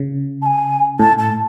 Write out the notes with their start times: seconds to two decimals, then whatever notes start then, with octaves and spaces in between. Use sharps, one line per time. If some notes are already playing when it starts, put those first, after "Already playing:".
Already playing: C#3
0.42 A5
0.46 G#5
0.99 A2 A5
1.18 A5